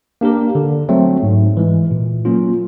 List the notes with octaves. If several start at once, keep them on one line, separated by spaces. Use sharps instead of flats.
A#3 D4 G4 A#4
D3
F#3 A3 C4
G#2
E3 G#3
A#2
F#3 A#3 C#4 F4